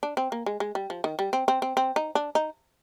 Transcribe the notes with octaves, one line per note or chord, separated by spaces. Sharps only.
D4
C4
A#3
G#3
G#3
G3
F3
D#3
G3
C4
C4
C4
C4
D#4
D4
D#4